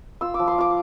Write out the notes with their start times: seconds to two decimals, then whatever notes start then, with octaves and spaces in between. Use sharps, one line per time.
0.21 F4 E6
0.34 D6
0.39 F3
0.48 C6
0.58 F4 D6